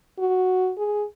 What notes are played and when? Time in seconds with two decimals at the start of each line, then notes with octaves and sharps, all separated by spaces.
0.19 F#4
0.78 G#4